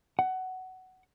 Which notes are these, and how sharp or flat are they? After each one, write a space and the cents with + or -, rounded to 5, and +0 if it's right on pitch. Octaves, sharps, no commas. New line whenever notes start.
F#5 +15